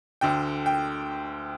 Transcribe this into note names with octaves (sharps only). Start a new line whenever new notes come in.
D2 D3 G5
G5